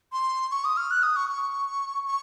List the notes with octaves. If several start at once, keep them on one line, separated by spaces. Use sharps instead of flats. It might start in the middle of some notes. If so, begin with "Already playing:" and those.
C6
C#6
D#6
F6
F#6
D#6
C#6
C#6
C#6